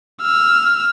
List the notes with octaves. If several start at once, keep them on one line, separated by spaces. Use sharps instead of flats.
E6 F6